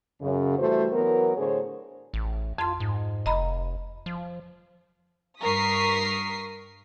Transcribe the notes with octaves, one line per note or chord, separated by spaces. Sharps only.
F#2 C#3
E3 G3 A3 F#4 C5
E3 F#3 B3 A#4
A2 D3 G#4 C5 C#5
A1
F2 F4 C6
G#2
F1 D#5 A#5 B5
F3
G2 A#4 C#6 D#6 B6 C7